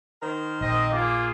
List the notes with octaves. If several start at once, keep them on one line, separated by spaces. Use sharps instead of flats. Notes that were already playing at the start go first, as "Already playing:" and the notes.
D#3 A#4 C5
A#1 C4 D#5
A#3 F4 G#4 D6